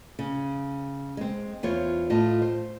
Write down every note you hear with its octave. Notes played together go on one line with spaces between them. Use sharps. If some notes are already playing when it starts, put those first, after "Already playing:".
C#3
G#3 C4
E2 F4 C5 C#5
A2 F4 D#5 A5
C5